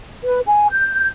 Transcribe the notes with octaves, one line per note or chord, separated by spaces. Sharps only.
B4
G#5
G6